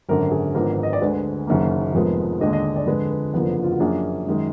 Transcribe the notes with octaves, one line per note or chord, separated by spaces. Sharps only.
G#1 F#2 D3 A#4
G#4
G#1 G#2 F3 B3 D4 A#4
D#5
D5
D2 D3 G#3 B4
F#1 F#2 D#3 A#3
F1 F2 F3 G#3 B3 A#4
D#2 D3 G#3 D4 D#5
D#5
D5
F2 D3 G#3 B4
B4
F#1 F2 D3 F3 B3 A#4
F4
F#4
F#2 F3 A#3 D4 G#4
F#2 D#3 G#3